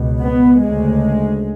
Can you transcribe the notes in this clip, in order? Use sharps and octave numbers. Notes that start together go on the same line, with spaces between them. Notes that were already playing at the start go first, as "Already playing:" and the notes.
Already playing: C#2 B2
B3
D2 C#3 G#3